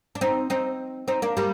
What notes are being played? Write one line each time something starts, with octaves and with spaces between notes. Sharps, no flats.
D4
C4 D#4
C4 D#4
C4 D#4
A#3 D4
G3 A#3